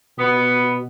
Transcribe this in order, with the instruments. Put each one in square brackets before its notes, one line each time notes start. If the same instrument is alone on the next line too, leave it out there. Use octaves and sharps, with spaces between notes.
[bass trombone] B2 [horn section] B3